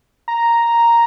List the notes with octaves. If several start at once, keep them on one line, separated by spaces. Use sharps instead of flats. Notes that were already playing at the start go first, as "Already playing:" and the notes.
A#5